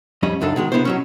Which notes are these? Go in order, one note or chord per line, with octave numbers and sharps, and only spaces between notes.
F2 G3 C#4 D#5 B5
C#2 F#2 D4 D#4 A4
B2 D#3 G#3
C3 B3 D4 E4 C5
B2 F#3 C#4